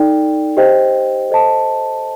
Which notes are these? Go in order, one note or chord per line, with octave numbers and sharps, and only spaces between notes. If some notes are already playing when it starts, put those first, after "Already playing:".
Already playing: D#4 A4 D5 G5
G4 C5 D#5 G5
A4 C5 D#5 A5